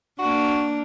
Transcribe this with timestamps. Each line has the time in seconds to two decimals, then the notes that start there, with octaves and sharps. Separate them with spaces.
0.19 A#3 D4 F#4